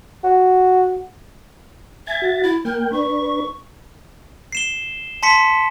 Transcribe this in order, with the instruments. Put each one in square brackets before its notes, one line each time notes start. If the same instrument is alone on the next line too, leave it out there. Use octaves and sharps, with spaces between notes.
[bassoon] F#4
[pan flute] E5 [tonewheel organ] G#5 G#6 A6
[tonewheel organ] F#4 A6
[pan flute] E4
[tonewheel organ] A#3 G5 [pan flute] A#4
[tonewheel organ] D4 B4 [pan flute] C#6
[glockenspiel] C7 E7 G7
A5 C6 B6 C#7